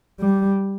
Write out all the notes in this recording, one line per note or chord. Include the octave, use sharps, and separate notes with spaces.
G3